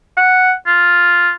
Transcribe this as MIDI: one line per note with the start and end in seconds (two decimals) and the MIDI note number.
0.17 0.53 78
0.67 1.31 65